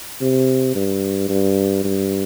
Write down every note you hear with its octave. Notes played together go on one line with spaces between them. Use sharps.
C3
G2
G2
G2